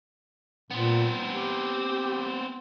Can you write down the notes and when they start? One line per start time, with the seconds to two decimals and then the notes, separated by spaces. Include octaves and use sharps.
0.71 A#2 B3 C4
1.31 G4